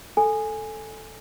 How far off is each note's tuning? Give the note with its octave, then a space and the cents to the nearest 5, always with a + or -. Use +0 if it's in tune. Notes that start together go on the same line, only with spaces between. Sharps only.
A4 +0 G#5 +0